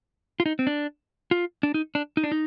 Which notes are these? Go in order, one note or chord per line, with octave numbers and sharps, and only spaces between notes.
F4
D#4
C4
D4
F4
D4
D#4
D4
D#4
D4
D#4